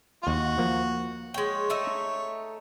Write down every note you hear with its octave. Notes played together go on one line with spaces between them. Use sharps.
D#2 F#4 F5
F3 A#3
G#3 C#5 G5
A3 D#4 E5